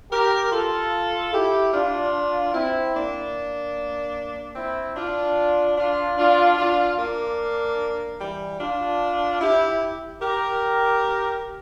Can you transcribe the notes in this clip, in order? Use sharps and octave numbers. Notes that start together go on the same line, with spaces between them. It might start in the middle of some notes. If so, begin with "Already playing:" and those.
G4 A#4
F4 A4
E4 G4
D4 F4
C4 E4
A#3 D4
C4 E4
D4 F4
D4 F4
D4 F4
D4 F4
A#3 D4
E3 G3
D4 F4
E4 G4
G4 A#4